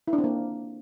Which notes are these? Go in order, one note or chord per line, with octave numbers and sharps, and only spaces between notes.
E4
D4
C4
A#3